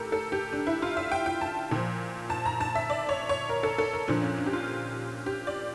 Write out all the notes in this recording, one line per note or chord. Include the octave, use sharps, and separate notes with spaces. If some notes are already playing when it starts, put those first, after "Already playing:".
Already playing: A2 G4 A4 A#4
A4
G4
D4
E4
F4
E5
G5
G5
A5
A#2 F3
A5
A#5
A5
E5
D5
C#5
C#5
A#4
A4
A4
A#4
A#2 F3 D4
C#4
D4
G4
F4
G4
D5